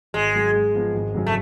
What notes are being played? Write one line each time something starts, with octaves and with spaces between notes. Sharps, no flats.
G#1 G#3
G#2 F#3
G#2
F3 B3 F4
G#1
F#2 C#3 F#3 C#4
A3